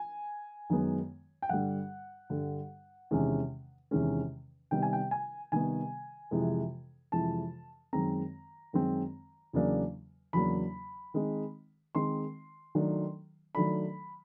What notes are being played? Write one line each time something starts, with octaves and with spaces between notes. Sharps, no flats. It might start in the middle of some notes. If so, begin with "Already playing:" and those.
Already playing: G#5
F#2 D#3 G#3 B3
G5
G2 D3 G3 F#5
G2 D3 G3
E2 C3 D#3 G#3 C#4
E2 C3 D#3 G#3 C#4
C3 D#3 G3 B3 G5
G#5
G5
G#5
C3 D#3 G3 B3 G#5
F2 C3 E3 G#3
F2 C3 E3 G#3 A5
F#2 D#3 G#3 C4 A#5
F#2 D#3 G#3 C4
E2 C#3 F#3 A#3 D4
E2 C#3 F#3 A#3 D4 B5
D#3 G#3 C4 D#4
D#3 G#3 C4 D#4 C6
D#3 F#3 A3 D4
D#3 F#3 A3 D4 B5